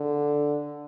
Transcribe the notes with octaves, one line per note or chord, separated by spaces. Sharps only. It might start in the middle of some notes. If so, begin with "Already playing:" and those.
Already playing: D3